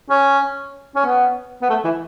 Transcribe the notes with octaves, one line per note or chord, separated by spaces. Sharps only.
C#4
C#4
B3
B3
A3
E3